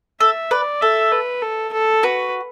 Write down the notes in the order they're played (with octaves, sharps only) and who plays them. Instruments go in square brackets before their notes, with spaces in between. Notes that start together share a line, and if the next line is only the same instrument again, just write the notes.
[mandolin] A4 [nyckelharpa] E5
[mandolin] B4 [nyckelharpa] D5
[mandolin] A4 [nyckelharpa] E5
[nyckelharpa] B4
A4
A4
[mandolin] F#4 [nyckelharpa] B4